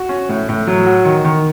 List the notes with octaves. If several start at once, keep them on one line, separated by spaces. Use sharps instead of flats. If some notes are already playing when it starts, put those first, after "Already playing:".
Already playing: F#4
C#4
A2
A2
F#3
F#4
D#3
D#3